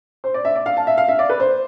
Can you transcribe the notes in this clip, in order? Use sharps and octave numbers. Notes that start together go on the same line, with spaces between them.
C5
D5
E5
D5
F5
A5
E5
F5
E5
D5
B4
C5